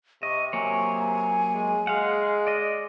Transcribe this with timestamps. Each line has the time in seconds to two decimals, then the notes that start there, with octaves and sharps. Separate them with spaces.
0.23 C3 D#5 C#6
0.53 F#3 A#3 C#5 G#5
1.54 G#3
1.87 G#3 F5 F#5
2.47 D5 D#5